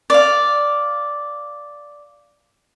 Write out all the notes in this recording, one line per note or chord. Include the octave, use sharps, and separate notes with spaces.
D5 F5